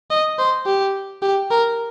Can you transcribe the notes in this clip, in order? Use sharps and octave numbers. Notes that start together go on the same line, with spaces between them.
D#5
C5
G4
G4
A#4